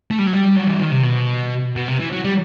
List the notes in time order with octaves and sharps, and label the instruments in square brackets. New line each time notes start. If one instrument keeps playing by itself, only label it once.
[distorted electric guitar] A3
G3
F#3
G3
F#3
E3
D#3
C3
B2
B2
C3
E3
F#3
G3